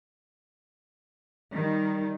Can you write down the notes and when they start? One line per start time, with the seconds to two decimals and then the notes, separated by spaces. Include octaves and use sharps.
1.53 D#3 G3